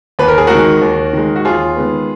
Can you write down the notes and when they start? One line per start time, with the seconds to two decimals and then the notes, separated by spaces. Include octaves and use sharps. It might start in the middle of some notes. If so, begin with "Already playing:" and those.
0.19 D#2 B4
0.28 A#4
0.38 G#4
0.47 G#3 F#4 A#4
0.55 D#3
0.82 D#2
1.13 D#3 G#3
1.36 F#4
1.45 D#2 F4 G#4
1.76 D#3 G#3 B3